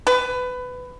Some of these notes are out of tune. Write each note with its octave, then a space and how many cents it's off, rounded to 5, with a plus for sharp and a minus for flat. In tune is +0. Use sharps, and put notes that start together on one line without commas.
B4 +20